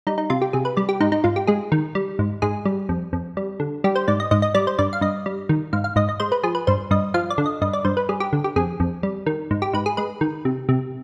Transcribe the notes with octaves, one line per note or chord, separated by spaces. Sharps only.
G3 D#4
D#4
C3 F4
G4
C3 G#4
B4
G3 D5
G4
G#2 D#4
D#4
G#2 F4
G4
G#3 G#4
D#3
G3
G#2
G#2 G#4
G3
F2
F2
G3
D3
G3 G4
C5
G#2 D5
D#5
G#2 D#5
D#5
G3 D5
C5
G2 D5
F5
G2 D#5
G3
D#3
G#2 F5
F5
G#2 D#5
D#5
G#3 C5
B4
F3 G#4
B4
G2 C5
G2 D#5
F3 F5
D5
D3
D#5
G2 D#5
D5
G2 C5
B4
G3 G#4
G4
D3
G4
F2 G#4
F2
G3
D#3
G#2
G4
G#2 B4
G#4
G#3 B4
D#3
C3
C3